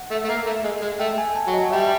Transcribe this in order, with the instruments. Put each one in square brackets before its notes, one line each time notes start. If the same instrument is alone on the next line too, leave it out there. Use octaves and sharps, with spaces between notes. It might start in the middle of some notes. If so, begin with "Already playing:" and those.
Already playing: [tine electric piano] F#5
[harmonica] A3
A3
A#3
A3
G#3
G#3
[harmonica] A3 [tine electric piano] G5
[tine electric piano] G#5
A5
[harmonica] F#3
[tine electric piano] D#5
[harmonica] G3 [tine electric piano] E5